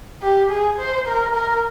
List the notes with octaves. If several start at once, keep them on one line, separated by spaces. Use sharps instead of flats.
G4
G#4
C5
A#4
A#4